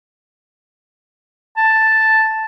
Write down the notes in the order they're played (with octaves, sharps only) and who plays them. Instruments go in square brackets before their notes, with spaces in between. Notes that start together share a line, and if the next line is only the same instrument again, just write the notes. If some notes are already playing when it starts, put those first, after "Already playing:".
[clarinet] A5